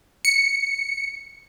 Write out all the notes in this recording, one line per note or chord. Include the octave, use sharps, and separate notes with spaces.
C#7